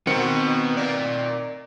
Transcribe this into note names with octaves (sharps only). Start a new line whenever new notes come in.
D#3 B3 C4 F#4 C#7
A#4 D5